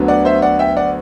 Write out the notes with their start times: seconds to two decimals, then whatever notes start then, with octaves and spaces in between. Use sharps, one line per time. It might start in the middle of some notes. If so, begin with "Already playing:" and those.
Already playing: D2 D3 F#3 B3
0.08 D5 F#5
0.25 C5 E5
0.42 D5 F#5
0.59 E5 G5
0.77 D5 F#5